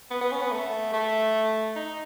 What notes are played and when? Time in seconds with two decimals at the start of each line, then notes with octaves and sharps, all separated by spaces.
0.11 B3
0.21 B3
0.31 C#4
0.41 B3
0.52 A3
0.93 A3
1.76 D#4